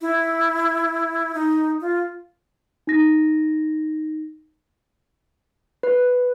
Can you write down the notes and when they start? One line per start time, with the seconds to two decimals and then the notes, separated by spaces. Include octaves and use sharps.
0.01 E4
1.35 D#4
1.81 F4
2.87 D#4 A#6
5.83 B4